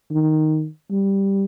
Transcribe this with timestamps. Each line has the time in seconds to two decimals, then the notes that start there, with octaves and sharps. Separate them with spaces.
0.11 D#3
0.91 G3